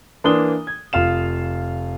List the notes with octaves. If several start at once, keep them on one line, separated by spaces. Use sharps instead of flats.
E3 A#3 D4 C6 D#6 G7
G#6
F1 F4 F5 E7